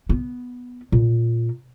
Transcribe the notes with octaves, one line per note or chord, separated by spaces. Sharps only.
B3
A#2